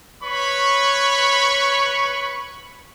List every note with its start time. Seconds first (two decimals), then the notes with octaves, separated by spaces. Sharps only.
0.23 B4 C#5 B5 C#6